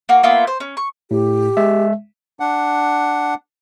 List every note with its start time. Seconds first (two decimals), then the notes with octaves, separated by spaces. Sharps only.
0.09 A#3 F#4
0.23 A#3 B3 F4 E5
0.47 C5
0.60 C#4
0.77 C#6
1.11 A2 G4
1.57 G#3 E5
2.40 D4 F#5